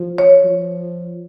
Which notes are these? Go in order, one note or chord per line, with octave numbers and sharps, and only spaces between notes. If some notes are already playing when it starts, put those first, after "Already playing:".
Already playing: F3
C#5
F3